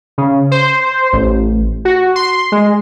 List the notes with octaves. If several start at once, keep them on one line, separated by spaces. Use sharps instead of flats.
C#3
C5
A1
F#4
C6
G#3